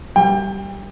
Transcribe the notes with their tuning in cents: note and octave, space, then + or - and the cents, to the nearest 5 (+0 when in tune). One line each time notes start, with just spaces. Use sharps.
G3 -10 G5 +30